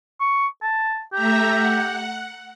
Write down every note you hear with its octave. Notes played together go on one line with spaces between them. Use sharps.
C#6
A5
A3 G4 E5 A#5
F#5